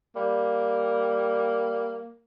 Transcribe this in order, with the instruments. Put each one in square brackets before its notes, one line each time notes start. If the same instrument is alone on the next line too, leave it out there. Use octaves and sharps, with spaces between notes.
[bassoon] G3 [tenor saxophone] A#3